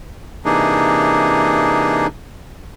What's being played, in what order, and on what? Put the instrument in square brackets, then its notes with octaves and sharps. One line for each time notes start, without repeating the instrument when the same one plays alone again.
[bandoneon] C3 E3 A#3 D4 D#4 G#4